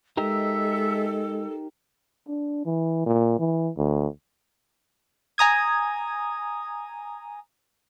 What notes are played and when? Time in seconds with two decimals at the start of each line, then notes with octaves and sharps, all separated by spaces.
0.17 G#3 D#4 G4 A4 A#4 E5
2.28 D4
2.66 E3
3.06 A#2
3.39 E3
3.77 D2
5.38 G#5 A#5 D#6 G#6